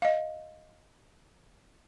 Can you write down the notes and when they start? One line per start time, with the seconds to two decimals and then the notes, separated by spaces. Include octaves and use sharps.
0.02 D#5 F5